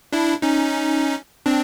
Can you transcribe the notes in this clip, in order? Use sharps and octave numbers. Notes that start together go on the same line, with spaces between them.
D4 E4
C#4 D#4
C4 D4